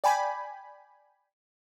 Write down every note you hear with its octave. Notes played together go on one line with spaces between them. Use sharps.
D5 G5 G#5 B5